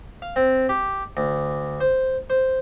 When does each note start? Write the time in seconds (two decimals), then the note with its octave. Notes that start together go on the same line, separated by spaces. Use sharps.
0.22 F5
0.36 C4
0.69 G4
1.17 D2
1.80 C5
2.30 C5